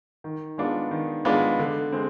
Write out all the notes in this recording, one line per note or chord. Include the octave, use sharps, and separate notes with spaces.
D#3
G#3 B3 D4 F4
D#3
G#3 B3 D4 F4
D3
G#3 C4